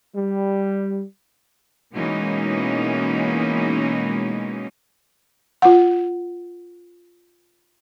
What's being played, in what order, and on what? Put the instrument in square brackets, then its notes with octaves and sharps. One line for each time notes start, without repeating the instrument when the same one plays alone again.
[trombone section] G3
[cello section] B2 E3 G#3 A#3 C#4 D#4
[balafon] F4 F#5